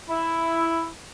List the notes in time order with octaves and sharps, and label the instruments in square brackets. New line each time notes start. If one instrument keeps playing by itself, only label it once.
[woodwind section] E4